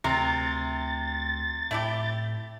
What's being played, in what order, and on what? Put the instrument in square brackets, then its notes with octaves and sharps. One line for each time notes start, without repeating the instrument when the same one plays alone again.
[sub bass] D2 [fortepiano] C3 [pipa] A#4 [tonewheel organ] A6
[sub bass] A2 [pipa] A3 E4 G4